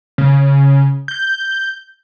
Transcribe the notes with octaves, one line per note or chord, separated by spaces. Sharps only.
C#3
G6